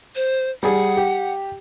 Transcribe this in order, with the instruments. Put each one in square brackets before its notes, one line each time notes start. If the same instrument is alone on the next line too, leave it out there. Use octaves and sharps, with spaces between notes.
[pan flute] C5
[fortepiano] G3 G#4 [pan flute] F#5
[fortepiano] G4